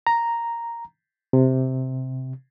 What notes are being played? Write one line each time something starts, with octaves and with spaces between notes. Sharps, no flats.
A#5
C3